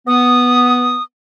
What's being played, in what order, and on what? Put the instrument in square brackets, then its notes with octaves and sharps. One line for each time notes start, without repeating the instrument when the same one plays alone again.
[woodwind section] B3 [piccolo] D#6